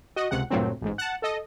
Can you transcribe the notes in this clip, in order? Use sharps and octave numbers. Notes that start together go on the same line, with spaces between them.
F#4 D#5
C#2 C3 F#5
D2 G2 A#2 F#3 A3 C4
A1 G#2
F#5 A5
A4 D#5